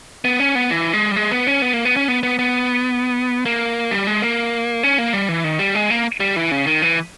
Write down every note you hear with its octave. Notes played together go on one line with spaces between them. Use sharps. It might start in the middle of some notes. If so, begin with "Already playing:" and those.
B3
C#4
B3
E3
G#3
G3
G#3
B3
C#4
B3
A#3
B3
C#4
B3
B3
B3
A#3
G3
G#3
A#3
C#4
A#3
G3
E3
D#3
G3
G#3
A#3
G3
E3
C#3
D#3
E3